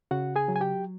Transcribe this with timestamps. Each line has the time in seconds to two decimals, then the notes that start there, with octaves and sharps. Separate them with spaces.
0.11 C#3 F#4 F#5
0.36 G#4 G#5
0.48 F#3
0.56 G#5
0.61 G4 G5